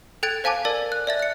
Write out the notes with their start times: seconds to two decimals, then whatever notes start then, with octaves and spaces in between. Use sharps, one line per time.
0.23 A4 G5 F#6 G#6 A6 D7
0.44 C5 F5 G#5 A5 D6
0.65 A#4 D5 A5 A6
0.92 F#6
1.07 D5 E5 A6
1.20 F#6 C#7